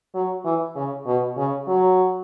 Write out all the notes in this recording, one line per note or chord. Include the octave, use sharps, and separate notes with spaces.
F#3
E3
C#3
B2
C#3
F#3